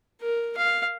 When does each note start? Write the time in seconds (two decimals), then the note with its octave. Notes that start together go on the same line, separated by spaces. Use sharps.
0.21 A#4
0.57 F5